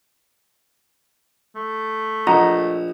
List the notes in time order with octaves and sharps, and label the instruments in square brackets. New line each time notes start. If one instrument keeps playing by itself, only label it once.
[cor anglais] A3
[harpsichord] A#1 [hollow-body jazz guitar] D#5 F#5 A#5